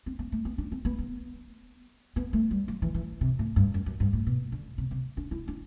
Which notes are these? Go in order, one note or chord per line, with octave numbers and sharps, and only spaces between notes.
C4
B3
A3
B3
D4
C4
B3
B3
B3
A3
G3
F#3
E3
E3
C3
A2
G2
F#2
F#2
G2
A2
B2
D3
C3
C3
D4
E4
D4